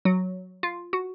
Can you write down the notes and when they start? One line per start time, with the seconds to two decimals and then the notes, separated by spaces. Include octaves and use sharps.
0.05 F#3
0.63 F4
0.93 F#4